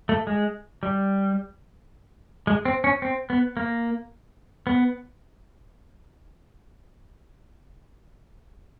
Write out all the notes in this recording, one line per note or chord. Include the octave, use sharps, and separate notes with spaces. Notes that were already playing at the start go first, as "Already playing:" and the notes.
A3
G#3
G3
G#3
C4
C#4
C4
B3
A#3
B3